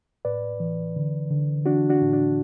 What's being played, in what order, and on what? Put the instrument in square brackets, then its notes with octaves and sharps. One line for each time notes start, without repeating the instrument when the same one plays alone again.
[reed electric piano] A2 B4 D5
E3
D3
D3
E3 D4 F#4
D4 F#4
A2
D4